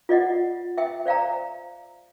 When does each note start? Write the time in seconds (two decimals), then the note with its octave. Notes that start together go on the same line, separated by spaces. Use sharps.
0.09 F4 D5 D#5 F#5
0.78 E5 G5
1.06 C5 D5 F5 G5 A#5